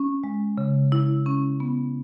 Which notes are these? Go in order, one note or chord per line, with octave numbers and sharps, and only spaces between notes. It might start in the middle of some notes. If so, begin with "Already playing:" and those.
Already playing: C#4
G#3
C#3
E4
C#4
B3